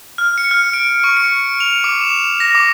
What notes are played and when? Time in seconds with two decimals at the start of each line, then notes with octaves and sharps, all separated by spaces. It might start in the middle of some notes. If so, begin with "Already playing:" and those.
0.18 F6
0.38 C#7
0.51 F6
0.74 D7
1.04 C#6
1.17 C#7
1.60 F7
1.84 D6
2.01 E7
2.40 A#6
2.55 D6